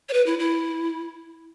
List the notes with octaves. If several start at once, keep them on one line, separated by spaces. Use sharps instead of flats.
C#5
B4
E4
E4